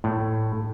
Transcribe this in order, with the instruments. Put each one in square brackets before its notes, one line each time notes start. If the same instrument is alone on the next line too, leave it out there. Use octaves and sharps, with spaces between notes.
[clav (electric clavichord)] A2